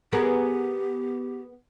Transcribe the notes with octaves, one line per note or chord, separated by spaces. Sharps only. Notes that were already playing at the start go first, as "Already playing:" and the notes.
B3 G4 G#4 A#4